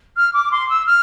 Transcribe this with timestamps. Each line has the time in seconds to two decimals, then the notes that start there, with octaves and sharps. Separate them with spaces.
0.16 F6
0.33 D6
0.51 C6
0.69 E6
0.86 F6